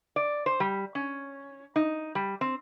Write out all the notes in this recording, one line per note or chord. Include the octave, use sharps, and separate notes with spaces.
D5
C5
G3
C#4
D#4
G3
C4